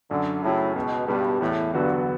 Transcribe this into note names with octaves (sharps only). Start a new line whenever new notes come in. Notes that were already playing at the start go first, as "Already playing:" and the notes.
F#2 D3
A2 C#3 F#3
C#2 B2
G2 B2 G3
E2 A2
G2 D3 F#3 B3 F#4